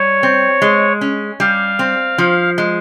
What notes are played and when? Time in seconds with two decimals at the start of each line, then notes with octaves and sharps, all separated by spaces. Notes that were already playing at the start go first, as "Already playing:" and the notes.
Already playing: G3 C#5
0.23 C4
0.62 G#3
1.01 C#4
1.40 G3 F5
1.79 C4
2.18 F3
2.58 G#3